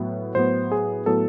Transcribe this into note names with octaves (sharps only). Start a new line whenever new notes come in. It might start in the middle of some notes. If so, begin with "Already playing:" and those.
Already playing: A2 F#3 B3
A2 F#3 B3 C5
G#4
A2 F#3 B3 A4